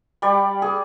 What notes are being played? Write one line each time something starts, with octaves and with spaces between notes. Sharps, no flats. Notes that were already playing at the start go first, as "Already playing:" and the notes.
G3 G4 D5
G#4 D6